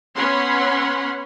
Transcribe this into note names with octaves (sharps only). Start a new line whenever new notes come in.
B3 C#4 C#5 F#5 B5 C6